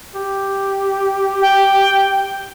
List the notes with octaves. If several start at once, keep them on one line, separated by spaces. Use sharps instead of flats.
G4
G5